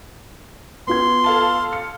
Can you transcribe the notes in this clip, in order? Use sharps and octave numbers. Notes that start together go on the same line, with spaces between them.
B3 F4 C6 G#6
A4 F5 A5
C#7